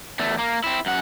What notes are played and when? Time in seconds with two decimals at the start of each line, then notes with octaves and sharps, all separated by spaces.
0.19 E2 A3
0.39 A#3
0.64 C4 E4
0.86 F#2 F#5